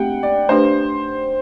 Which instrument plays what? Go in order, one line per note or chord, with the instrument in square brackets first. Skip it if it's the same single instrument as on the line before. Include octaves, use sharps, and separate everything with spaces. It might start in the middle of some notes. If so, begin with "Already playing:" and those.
Already playing: [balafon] A3 C4 G4 [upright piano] F#5 G5
[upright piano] D5
[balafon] A3 D4 G4 B4 [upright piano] C5